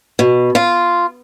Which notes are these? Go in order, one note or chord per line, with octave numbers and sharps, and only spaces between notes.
B2
F4